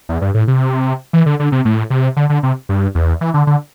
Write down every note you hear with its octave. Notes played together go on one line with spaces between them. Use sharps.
E2
G2
A2
C3
E3
D3
D3
C3
A2
C3
D3
D3
C3
G2
E2
E3
D3
D3